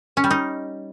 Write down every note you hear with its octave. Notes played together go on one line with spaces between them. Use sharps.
C#4
G3
D#4